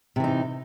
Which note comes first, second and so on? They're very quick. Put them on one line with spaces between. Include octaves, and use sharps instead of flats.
C3 E3 D#4